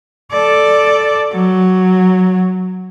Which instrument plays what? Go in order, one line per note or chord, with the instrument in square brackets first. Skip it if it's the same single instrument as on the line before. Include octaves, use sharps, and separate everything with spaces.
[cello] A4 D5
F#3